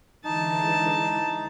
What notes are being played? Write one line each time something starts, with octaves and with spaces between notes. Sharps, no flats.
D3 E3 G#3 D#4 A5